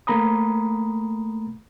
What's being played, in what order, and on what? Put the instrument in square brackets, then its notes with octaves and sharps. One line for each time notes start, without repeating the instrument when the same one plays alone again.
[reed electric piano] A3 A#3 A#5 B5 D#6